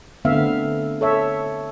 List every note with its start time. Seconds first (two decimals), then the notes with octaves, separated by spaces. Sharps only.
0.25 D3 A3 B3 C4 E5 F5
1.01 A4 C#5 E5